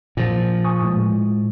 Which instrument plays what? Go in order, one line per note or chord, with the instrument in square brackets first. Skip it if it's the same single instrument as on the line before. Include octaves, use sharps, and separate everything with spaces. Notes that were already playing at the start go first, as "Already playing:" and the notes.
[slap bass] A#2 F3
[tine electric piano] G#5 C#6 D#6
A2 G#3